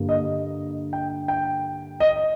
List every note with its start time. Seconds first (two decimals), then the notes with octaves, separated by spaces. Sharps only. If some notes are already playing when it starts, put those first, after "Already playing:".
Already playing: G2 D3 G3 A#3
0.09 D#5
0.93 G5
1.28 G5
2.00 D#5